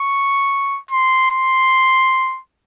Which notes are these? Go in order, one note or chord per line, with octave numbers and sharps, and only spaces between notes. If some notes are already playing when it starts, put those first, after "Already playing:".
Already playing: C#6
C6
C6